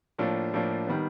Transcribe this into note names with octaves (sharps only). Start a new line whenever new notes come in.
A2 F3 A#3 D4 F4
A2 F3 A#3 D4 F4
D#3 G3 B3